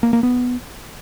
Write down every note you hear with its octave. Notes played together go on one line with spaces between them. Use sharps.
A#3
A#3
B3